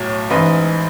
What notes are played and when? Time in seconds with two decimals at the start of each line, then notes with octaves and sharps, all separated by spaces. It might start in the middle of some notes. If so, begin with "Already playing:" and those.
Already playing: B1 A2 F#3 C#5
0.30 A1 G#2 E3 B4 D#5